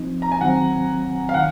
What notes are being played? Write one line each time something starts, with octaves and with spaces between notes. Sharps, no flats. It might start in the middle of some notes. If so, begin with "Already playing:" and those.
Already playing: F3 C4 D#4
A#5
G#5
D#3 F#3 C4 F#5
F5
D#3 F#5